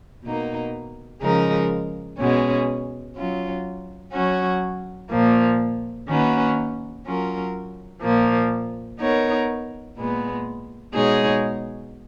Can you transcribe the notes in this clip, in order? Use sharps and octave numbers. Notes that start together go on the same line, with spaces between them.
B2 A#3 D#4
C#3 F3 G#3 D#4 A#4
B2 G#3 C#4
F#3 C#4 F4
F#3 C#4 F#4 C#5
A#2 F3 A#3
D#3 A#3 C#4 F#4 B4
F#3 C#4 F4 A#4
A#2 F3 A#3
B3 D#4 A#4 C#5
A#2 G#3 B3
B2 G#3 D#4 G#4 C#5